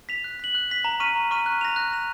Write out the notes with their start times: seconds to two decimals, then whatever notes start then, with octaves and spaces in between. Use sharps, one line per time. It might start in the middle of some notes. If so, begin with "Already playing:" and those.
0.09 B6 F7
0.24 F#6
0.39 B6 F#7
0.55 F#6
0.70 B6 F#7
0.85 A#5
1.00 C#6 F6 B6 D#7
1.16 A#5
1.31 C#6 F6 B6 D#7
1.46 F#6
1.61 A#6 F7
1.76 F#6
1.92 A#6 F7